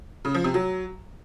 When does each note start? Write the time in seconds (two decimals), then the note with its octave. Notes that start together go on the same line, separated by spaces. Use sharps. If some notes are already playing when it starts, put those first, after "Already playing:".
0.25 C#3
0.34 F3
0.44 C3
0.54 F#3